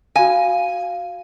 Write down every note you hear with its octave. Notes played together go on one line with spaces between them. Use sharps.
F#4 F5 G#5